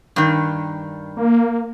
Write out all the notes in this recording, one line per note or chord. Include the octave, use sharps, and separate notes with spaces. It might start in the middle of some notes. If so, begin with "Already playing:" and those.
G2 D#3
A#3